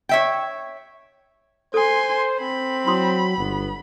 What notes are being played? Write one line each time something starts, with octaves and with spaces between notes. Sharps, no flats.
C#5 E5 G5
A4 C5 G#5 C6 D#6
C4 B5
F#3 E4 C6 D#6
G1 B3